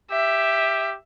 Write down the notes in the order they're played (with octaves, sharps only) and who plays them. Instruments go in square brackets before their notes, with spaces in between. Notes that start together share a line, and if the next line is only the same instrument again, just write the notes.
[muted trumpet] G4 [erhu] E5